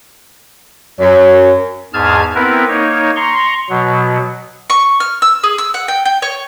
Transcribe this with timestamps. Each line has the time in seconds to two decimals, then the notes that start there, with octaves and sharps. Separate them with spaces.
1.00 F#2 C#5
1.94 E2 G#2 G#4 A5 F6 G#6
2.35 B3 C4 E4 A#4 B4
2.68 A#3 D#4 C#5
3.16 A#5 C6 C#6
3.70 B2 F#3
4.70 C#6
5.00 F6
5.22 E6
5.44 G#4
5.58 E6
5.74 F#5
5.88 G5
6.05 G5
6.22 C#5